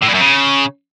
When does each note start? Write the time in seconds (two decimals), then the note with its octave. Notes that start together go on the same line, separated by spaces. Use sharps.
0.02 A2
0.08 G2
0.14 F#2
0.20 C#3